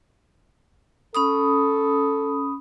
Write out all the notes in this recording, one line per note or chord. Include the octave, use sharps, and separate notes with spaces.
C#4 A4 B5 D#6